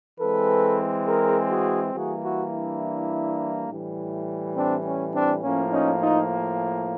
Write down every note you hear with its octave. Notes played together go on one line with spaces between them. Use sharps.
E3 G#3 C4 A4 B4
G#4 A#4
F#4 G#4
E3 G3 A#3 F#4 G#4
E4 F#4
D4 E4
A2 E3 G3
C4 D4
C#4
C4 D4
A2 F3 A#3 C#4
C#4 D#4
D#4 F4